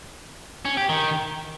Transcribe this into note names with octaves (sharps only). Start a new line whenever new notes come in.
C#4
G4
D#3